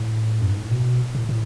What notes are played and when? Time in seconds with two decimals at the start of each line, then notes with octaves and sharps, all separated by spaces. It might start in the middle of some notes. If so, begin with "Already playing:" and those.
Already playing: A2
0.41 F#2
0.51 G#2
0.61 A2
0.71 B2
1.15 A2
1.29 A2